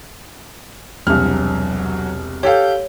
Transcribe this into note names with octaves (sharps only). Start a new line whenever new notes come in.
E1 C2 F#3 F6
G4 A4 C#5 F5 G6